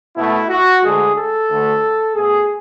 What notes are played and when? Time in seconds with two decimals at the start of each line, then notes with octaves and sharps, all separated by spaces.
0.16 B2 A3 E4
0.49 F#4
0.82 D2 D3 G#3 G#4
1.15 A4
1.49 D2 D3 A3
2.15 B2 A3 G#4